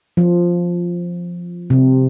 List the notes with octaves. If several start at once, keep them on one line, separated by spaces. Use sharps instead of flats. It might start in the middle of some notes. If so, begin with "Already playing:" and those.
F3
C3